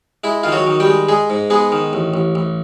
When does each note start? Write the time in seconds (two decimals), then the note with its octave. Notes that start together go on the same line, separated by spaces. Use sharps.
0.24 G#3 E4
0.43 D#3 F4
0.52 F#3 F#4
0.67 D#3
0.80 G3 G4
0.87 G#3
1.09 G#3 G#4
1.30 G#2
1.50 G#3 B3 G#4
1.72 D#3
1.93 A1
2.14 A1
2.35 A1